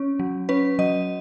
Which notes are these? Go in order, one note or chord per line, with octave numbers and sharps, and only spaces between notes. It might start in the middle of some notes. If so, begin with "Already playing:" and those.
Already playing: C#4
F#3
C#4 B4
F#3 D#5